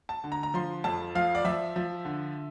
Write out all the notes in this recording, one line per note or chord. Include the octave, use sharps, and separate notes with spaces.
A5
D3
A#5
A#5
F3 C6
F2 A5
F3 F5
D5
F3 E5
F3
D3